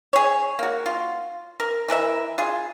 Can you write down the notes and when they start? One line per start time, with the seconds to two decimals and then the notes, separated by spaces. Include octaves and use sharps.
0.13 G#4 C#5
0.59 A#3 F#4
0.86 F4
1.60 A#4
1.88 E3 A#4 B4 E5
2.38 F4 G#4